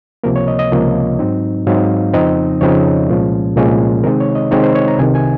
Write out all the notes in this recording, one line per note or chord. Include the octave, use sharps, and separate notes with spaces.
C#2 C3 F3 A#3 A#4
C#5
D#5
D#5
C#2 C3 F3 A#3
G#2 F#3 C4 D#4
G#2 F#3 C4 D#4 F5
F2 C#3 F3 C4 D#4 D#5
F2 C#3 F3 C4 D#4 C#5
C2 A#2 F3 G#3 C#4
C2 A#2 F3 G#3 C#4
C3 D#3 G#3 C4 D#4 A#4
C#5
D#5
C3 D#3 G#3 C4 D#4 C#5
C5
C#5
A#5
C2 C3 D#3 G#5
G#5